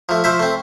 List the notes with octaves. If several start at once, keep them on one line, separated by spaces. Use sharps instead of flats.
F3 A3
F3 C5 E5
A3 C4